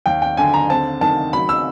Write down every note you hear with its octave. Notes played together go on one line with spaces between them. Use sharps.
D#2 G5
G5
D3 G#5
A#5
C4 A5
D#3 A5
F#3 B5
E6